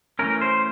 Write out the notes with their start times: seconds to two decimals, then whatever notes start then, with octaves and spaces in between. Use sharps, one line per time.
0.19 E3 A3 C#4 A#4
0.42 C5